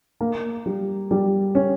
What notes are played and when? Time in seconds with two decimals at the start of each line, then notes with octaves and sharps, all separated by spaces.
0.21 A#3
0.66 G3
1.11 G3
1.55 C#4